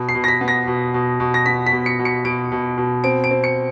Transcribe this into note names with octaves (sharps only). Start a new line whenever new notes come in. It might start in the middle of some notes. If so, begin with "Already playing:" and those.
Already playing: B2
C7
B2
A#6
B6
B3
A#6
B2
B2
B2
A#6
B3 B6
B6
B2
C#7
B2
C#7
B2 D7
B2
B2
C4 D7
D7
C4
C#7